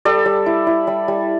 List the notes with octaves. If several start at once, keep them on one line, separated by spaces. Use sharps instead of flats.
G3 A4 D5
G3
E4
E4
G3
G3